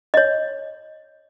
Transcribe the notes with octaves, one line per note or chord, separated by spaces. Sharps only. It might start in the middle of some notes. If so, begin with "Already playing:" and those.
C#5 D#5